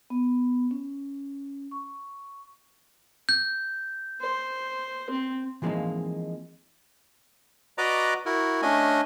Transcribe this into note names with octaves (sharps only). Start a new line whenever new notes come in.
B3
C#4
C#6
G6
C5
C4
E3 F3 G#3 A#3 C4 D#4
F#4 B4 D5 D#5 A#5 D6
E4 F#4 A#4
A3 C#4 D4 D#5 G#5